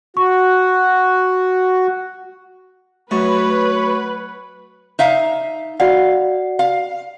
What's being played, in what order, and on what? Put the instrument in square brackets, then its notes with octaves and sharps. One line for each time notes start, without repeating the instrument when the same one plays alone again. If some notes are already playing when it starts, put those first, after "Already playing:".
[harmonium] F#4 [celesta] C#6
[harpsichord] F#2 [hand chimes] A3 [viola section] B4 [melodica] C#5
[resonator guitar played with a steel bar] D#4 E5 F5
[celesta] F#4 D5 F#5 [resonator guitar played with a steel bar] F5
[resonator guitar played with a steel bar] F5